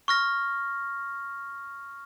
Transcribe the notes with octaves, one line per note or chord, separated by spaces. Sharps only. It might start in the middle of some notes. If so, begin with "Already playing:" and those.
C#6 F6 A#6